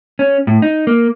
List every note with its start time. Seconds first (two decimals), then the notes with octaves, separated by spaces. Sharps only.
0.19 C#4
0.47 A2
0.62 D#4
0.87 A#3